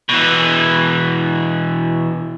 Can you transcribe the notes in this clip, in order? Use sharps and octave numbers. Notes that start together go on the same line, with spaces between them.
B2 E3